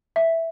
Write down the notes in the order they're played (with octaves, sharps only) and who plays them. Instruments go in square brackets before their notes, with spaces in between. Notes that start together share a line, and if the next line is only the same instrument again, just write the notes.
[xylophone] E5